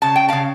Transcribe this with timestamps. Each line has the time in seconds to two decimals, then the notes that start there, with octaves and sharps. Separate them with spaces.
0.02 C#3 A5
0.16 G5
0.29 C#3 F5 A5